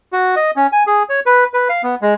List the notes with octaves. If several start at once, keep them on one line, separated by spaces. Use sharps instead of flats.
F#4
D#5
C#4
G#5
G#4
C#5
B4
B4
F5
B3
G#3